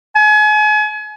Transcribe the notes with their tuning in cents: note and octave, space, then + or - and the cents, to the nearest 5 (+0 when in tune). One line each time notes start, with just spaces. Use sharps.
G#5 +35